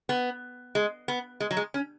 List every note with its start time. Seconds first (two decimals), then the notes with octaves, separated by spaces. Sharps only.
0.09 B3
0.75 G#3
1.08 B3
1.40 G#3
1.51 F#3
1.57 G#3
1.74 C#4